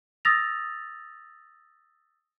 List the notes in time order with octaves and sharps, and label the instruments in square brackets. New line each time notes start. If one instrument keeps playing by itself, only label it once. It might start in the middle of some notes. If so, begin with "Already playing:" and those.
[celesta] D#6 E6 A6 A#6 F7